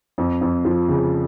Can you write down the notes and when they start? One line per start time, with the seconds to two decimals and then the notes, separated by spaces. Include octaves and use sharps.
0.18 F2
0.41 F2
0.65 F3
0.89 C#3